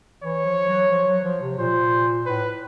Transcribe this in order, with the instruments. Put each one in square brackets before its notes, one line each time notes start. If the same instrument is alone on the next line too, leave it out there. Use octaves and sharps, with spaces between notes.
[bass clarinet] E3 [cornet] C#5
[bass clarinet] F3
F#3
F3
F#3
F3
C3
[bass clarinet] A#2 [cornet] C5
[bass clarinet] A2 [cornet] B4